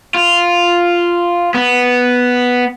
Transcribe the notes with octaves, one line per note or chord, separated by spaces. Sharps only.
F4
B3